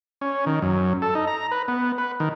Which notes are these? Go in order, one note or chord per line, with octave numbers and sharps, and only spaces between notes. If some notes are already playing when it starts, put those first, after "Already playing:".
C#4
D#3
F#2
A4
D#4
A#5
B4
B3
B4
D#3